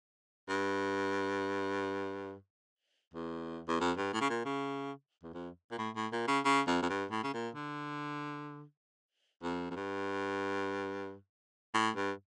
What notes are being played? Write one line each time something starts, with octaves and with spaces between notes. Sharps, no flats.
G2
E2
E2
F2
G2
A2
C#3
A#2
C#3
E2
F2
A#2
A2
A2
A#2
C#3
C#3
F2
F2
G2
A2
C#3
A#2
D3
F2
F2
G2
A2
G2